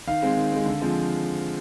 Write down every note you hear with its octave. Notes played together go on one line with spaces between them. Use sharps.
D#3 F5
G#3 C4
D#3
G#3 C4
D3
F3 G#3 C4